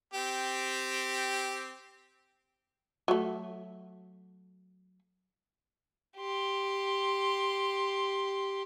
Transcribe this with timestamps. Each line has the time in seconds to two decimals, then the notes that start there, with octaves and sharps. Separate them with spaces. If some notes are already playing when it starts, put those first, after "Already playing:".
0.14 C4 G4
3.08 F#3 A3
6.18 G4 C6